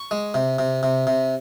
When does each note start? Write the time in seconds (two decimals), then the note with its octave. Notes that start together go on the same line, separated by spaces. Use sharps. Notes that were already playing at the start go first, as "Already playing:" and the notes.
Already playing: C#6
0.11 G#3
0.34 C3
0.59 C3
0.83 C3
1.07 C3